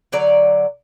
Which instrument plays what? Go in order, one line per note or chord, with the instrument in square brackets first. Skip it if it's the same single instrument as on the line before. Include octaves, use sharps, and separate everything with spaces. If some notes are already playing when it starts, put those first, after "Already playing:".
[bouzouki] D3 F#3 D5 A#5